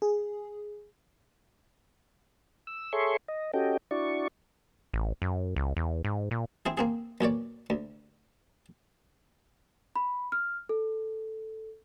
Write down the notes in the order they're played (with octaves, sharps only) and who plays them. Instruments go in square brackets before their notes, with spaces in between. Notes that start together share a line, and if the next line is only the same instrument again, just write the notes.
[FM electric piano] G#4
[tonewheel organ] E6
G#4 A4 C#5 E5 C6 C#6
D#5
C#4 F#4 G4 A4 D#5 G5
D4 E4 F#4 D5 C#6
[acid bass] A1
F#2
C#2
E2
G#2
A#2
[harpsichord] C4 E4 G#4
A#3 C4 G#4
B1 A#2 C#5 D5
D2
[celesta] B5
F6
A4